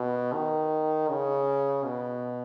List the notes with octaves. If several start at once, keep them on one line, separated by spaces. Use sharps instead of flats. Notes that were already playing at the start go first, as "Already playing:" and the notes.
Already playing: B2
D#3
C#3
B2